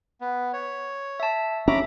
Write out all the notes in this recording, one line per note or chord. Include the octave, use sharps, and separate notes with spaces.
B3
C#5
E5 A5
C#4 E5 A#5 B5 D6